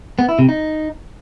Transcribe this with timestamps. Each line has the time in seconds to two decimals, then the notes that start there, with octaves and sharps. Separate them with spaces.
0.19 B3
0.29 E4
0.39 C3
0.49 D#4